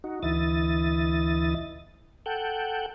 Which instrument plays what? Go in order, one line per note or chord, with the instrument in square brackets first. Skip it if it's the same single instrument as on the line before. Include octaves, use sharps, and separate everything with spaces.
[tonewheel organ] D#4 F#4
D2 E3 E4 D#5 A6
A4 F#5 G5